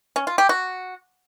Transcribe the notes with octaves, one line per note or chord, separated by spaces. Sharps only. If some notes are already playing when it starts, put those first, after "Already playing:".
C#4
F4
G4
F#4